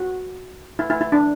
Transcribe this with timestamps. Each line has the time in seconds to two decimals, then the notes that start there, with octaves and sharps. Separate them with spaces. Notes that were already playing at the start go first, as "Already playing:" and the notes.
Already playing: F#4
0.79 E4
0.90 E4
1.01 E4
1.12 D4